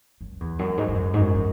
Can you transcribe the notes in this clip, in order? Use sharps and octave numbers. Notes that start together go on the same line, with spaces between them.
F#2
E2
F#2
G#2
G#2
F#2
G#2
F#2
E3